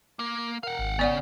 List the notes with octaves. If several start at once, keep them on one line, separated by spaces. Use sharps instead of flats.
A#3
A#4 F5 F#5
G#1
C#3 B3 D5 F#5